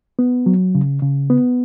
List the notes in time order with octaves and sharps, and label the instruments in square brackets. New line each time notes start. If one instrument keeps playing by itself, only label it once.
[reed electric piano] B3
F#3
C#3
C#3
B3